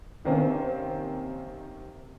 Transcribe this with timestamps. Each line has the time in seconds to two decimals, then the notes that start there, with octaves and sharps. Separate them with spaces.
0.25 C3 D#3 A#3 C4 C#4